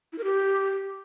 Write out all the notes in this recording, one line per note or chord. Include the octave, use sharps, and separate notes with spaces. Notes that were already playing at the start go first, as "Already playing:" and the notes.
E4
A#4
G4